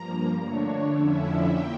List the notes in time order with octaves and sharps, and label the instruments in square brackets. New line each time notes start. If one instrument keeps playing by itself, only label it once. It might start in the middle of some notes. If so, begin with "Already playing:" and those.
Already playing: [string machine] G2 F3 A#3 A#5
D3 A3 D4 C#5
F2 D3 F3 C#4 E4 E5
A#3 G5